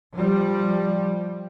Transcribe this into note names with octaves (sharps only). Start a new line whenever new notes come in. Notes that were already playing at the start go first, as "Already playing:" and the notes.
F3 G3